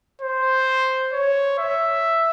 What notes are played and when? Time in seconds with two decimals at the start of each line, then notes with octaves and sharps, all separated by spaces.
0.21 C5
1.13 C#5
1.58 E5